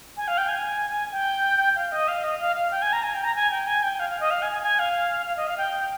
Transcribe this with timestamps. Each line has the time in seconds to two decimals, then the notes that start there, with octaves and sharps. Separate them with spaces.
0.17 G#5
0.28 F5
0.38 G5
0.48 G#5
1.12 G5
1.76 F5
1.92 D#5
2.08 F5
2.24 D#5
2.40 F5
2.56 F5
2.71 G5
2.82 G#5
2.93 A#5
3.04 G#5
3.14 G5
3.24 A#5
3.36 G#5
3.51 G5
3.67 G#5
3.83 G5
4.00 F5
4.10 F5
4.20 D#5
4.31 F5
4.42 G#5
4.52 G#5
4.62 G#5
4.79 F5
5.26 F5
5.37 D#5
5.47 F5
5.58 G5